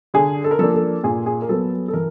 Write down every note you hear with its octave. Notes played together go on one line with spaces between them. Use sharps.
D3 G#4
A4
A#4
F3 A#3 D4 A4
A4
A#2 G#4
G#4
A#4
F#3 B3 A4
A4
E3 A#4